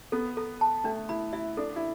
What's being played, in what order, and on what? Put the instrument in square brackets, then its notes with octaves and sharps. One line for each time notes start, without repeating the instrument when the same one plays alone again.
[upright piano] B3 [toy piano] A4
[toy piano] A4
A5
[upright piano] A3 [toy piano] D4
[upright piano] E4 [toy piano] B5
[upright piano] E4 [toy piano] E5
[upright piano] D4 [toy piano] A4
[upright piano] E4